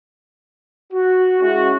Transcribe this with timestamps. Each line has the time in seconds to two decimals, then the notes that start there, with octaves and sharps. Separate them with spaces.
0.93 F#4
1.40 G#3 C#4 E4 F#4